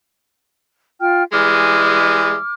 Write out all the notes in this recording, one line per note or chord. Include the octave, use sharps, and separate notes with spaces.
F4 G5 F6
E3 G3 G#3 D6 F6